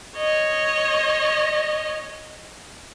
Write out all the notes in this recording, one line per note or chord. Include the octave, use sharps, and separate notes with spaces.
C#5 D#5